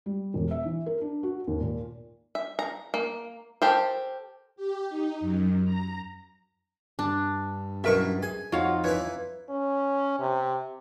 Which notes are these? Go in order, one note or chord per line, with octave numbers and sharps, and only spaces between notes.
G3
E1
E5
E3
A#4
D4
F#4
D#2
A#2
E5
A#5
A#3
G4 A4 A#4 C5
G4
D#4
F#2
A#5
G2 D4
F#2 B2 E4 A#4 E5 C#6
G#4 G#5
F2 D#4 F4 F#4 C#5 F5 F#5
E3 E4 B4 C#5
C#4
C3